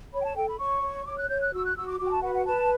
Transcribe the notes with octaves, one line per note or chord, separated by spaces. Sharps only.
C#5 B5
G5
A5
A4 G5
B5
C#5 C#6
C#5
C#5 D6
F#6
C#5 G6
F#6
F#4 E6
F#6
F#4 E6
D6
F#4 D6
G5
A5
B4 F#5
F#5
B4 A5